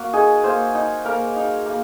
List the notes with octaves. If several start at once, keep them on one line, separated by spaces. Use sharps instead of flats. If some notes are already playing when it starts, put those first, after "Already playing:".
Already playing: A#3 F#4
D#4 G#4
A#3 C5
D#4
A#3 A#4
D#4
A#3